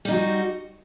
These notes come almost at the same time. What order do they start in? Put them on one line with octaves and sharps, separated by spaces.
G3 D#4 F#4